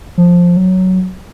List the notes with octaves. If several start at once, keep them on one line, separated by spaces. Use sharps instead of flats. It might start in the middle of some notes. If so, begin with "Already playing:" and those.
F3
F#3